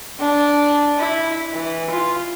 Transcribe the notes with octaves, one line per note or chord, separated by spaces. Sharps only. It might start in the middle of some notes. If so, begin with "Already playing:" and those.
D4
E4
E3
F4